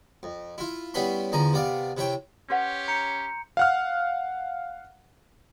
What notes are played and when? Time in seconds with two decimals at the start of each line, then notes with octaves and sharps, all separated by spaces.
0.23 F2
0.58 E4 F4
0.94 G3 B3 C#4 E4 B5 C6
1.32 E2 D3 F3 G#5 A#5
1.53 C3 B3 D5 F5
1.97 C3 E4 C#5 G5
2.50 C#4 G4 B4 C#5 F#5 C6
2.88 A#5 G6 C#7
3.57 F5 F#5 F6